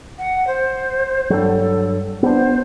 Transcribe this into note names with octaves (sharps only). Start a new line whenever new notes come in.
F#5
C5
G2 F#3 A4
B3 D4 C5